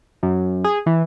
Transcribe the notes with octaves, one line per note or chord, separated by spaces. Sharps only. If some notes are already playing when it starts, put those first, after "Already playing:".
F#2
G#4
E3